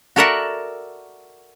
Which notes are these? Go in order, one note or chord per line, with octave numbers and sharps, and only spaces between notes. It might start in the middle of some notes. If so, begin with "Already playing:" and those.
F#4 A4 A#4 D5 E5 F#5